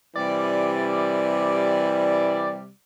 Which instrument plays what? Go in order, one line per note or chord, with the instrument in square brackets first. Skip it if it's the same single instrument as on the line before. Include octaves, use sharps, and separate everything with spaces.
[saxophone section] C3 G3 [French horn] E3 [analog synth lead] D5